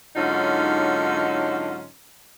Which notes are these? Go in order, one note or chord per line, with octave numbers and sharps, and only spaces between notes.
G#2 D3 F#3 C#4 D#4 F4